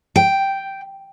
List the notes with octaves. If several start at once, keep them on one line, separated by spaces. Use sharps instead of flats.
G5